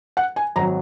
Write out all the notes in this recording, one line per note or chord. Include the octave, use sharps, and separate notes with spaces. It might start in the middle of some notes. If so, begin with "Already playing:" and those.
F#5
G#5
G#1 F#3 A#5